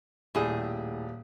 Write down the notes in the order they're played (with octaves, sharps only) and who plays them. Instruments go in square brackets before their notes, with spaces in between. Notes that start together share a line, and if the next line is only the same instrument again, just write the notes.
[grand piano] D#1 G4 D5 [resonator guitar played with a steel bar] A2 G#4